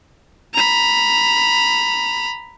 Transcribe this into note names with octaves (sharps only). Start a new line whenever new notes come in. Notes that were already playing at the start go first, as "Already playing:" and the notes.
A#5 B5